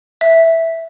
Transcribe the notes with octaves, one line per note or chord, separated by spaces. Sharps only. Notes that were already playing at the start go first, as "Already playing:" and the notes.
E5